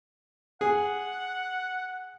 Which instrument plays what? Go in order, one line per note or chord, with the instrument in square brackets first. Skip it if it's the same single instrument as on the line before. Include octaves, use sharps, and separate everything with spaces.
[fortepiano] G#4 [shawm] F#5